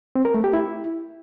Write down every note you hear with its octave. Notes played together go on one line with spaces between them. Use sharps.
C4
A#4
A3
G4
E4